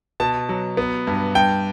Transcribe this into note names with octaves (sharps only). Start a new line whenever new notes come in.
B2 A5
F#3
B3
G2
G2 G5